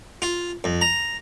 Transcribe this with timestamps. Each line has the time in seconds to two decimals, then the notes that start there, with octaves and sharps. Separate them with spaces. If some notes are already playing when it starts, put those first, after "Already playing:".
0.22 F4
0.64 F2
0.81 A#5